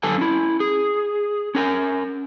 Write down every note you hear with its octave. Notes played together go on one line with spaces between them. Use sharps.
F#2 D3 A4 G#5 A5
C#4 E4
G#4
C#4 A#4 G#5